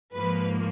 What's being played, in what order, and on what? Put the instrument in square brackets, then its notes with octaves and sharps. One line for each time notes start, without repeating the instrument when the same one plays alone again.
[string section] G#2 F3 A#3 B4